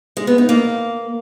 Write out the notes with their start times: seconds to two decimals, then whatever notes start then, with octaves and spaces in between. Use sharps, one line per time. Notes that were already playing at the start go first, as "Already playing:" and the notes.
0.17 G#3
0.27 B3
0.38 D#4
0.49 A#3